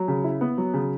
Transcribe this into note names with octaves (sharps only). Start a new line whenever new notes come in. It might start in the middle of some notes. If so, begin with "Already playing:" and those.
Already playing: F#3
C#3
E4
B3
F#3
C#3